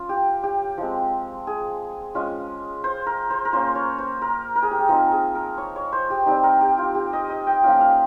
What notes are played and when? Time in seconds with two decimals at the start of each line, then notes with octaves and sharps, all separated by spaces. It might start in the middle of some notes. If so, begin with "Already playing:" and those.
Already playing: C#4 F4
0.09 G4
0.43 G4
0.78 F3 G#3 C4
1.47 G#4
2.15 G#3 C#4 F4
2.84 C5
3.06 A#4
3.30 C5
3.45 A#4
3.53 A#3 C#4 F4 C5
3.75 C#5
3.98 C5
4.22 A#4
4.56 A#4
4.63 G#4
4.71 G4
4.79 G#4
4.89 F3 C4 D#4 G#4
5.12 G#4
5.35 A#4
5.58 C#5
5.76 C#5
5.92 C5
6.10 G4
6.26 G3 C4 D#4 G4
6.43 A#4
6.61 G4
6.78 F4
6.95 G4
7.13 D#5
7.30 D#5
7.47 G5
7.63 F3 A#3 C#4 F4 G5
7.80 F5